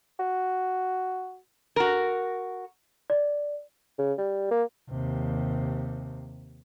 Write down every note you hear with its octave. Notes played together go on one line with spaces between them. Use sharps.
F#4
F#4 A#4
D5
C#3
G3
A#3
D#2 C3